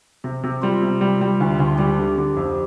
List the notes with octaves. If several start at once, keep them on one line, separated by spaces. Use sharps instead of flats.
C3
C3
G3 F4
C3
G3
G3
D2
D2
G3 G4
D3
D3
F2